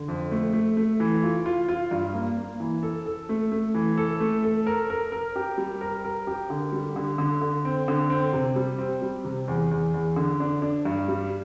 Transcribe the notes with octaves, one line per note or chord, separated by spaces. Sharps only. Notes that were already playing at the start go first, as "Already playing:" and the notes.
Already playing: D3
F2
A3
A3
A3
E3
F4
F4
F4
G2
A#3
A#3
E3
A4
A4
A3
A3
E3
A4
A3
A4
A#4
A#4
A#4
G4
G3
A#4
A#4
G4
D3
G3
D3
D3
D3
C4
D3
C4
C3
G3
C4
G3
C3
E2
E2
E2
D3
D4
D4
G2
G3